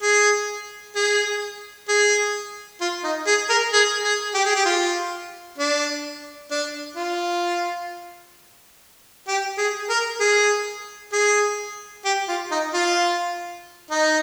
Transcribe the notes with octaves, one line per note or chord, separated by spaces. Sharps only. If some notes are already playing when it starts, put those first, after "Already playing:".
G#4
G#4
G#4
F4
D#4
G#4
A#4
G#4
G#4
G4
G#4
G4
F4
D4
D4
F4
G4
G#4
A#4
G#4
G#4
G4
F4
D#4
F4
D#4